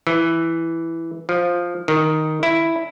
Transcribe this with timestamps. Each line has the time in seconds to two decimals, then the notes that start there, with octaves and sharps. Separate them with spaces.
0.07 E3
1.29 F3
1.88 D#3
2.43 E4